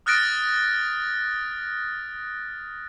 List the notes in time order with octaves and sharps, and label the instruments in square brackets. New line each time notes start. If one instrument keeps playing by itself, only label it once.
[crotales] D#6 F6 F#6 A6 A#6 D7